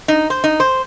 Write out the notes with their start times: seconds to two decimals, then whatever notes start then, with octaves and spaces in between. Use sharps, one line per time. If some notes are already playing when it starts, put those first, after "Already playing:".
0.08 D#4
0.30 C5
0.44 D#4
0.60 C5